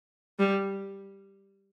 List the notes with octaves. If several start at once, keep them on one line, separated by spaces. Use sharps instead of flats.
G3